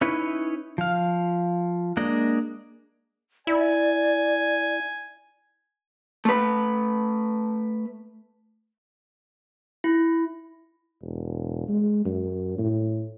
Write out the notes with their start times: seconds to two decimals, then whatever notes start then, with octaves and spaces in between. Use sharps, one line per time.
0.01 C#4 D#4 E4 B4 C#5
0.78 F3 F5
1.97 G#3 A#3 D4 D5 D#5
3.47 E4 D5 G#5
6.25 A3 B4
9.84 E4
11.02 E1
11.68 G#3
12.05 F#2
12.58 A2